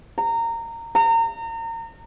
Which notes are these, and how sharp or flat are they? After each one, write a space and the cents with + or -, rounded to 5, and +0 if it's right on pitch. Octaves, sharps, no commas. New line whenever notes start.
A#5 -20
A#5 -30